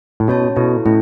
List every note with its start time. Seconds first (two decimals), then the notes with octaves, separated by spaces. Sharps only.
0.20 A2
0.28 B2 C#4 F#4 C#5 A5
0.56 B2 B3 E4 A4
0.86 A2 A3 C#4 E4